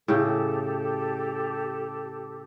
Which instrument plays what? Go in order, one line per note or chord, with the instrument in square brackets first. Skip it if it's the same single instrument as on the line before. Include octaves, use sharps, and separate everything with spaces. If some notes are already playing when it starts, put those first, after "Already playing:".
[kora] A2 C#3 [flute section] G4 A4